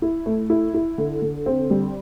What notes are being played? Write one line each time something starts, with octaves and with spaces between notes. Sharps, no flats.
E4
A3
E4
E4
D3
D3
C4
G3